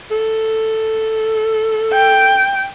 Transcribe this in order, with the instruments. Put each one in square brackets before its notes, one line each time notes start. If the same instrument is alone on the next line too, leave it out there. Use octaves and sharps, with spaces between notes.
[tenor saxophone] A4
[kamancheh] G5